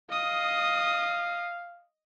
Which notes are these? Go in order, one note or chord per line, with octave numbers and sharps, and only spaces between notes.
D#5 F5 D#6